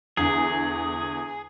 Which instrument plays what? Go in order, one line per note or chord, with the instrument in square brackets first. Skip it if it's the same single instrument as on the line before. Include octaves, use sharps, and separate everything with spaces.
[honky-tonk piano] E2 D3 [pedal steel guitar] G#4